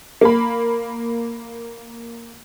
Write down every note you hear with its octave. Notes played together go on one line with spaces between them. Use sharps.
A#3 B5